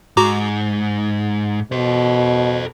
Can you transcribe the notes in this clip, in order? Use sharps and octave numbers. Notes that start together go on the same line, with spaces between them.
G#2 F#4 A#5 D6
B2 A4 C5